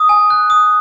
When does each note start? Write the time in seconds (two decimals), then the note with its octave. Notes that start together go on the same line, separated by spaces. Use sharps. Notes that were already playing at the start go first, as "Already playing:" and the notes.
Already playing: D#6
0.09 G#5
0.30 F#6
0.50 D#6